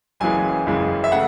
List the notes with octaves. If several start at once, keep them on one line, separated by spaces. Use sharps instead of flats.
F#1 F#2 C#3 E3 G#3 G#5
F#1 F#2 C#3 E3 G#3
E5
C#3 A3 F#5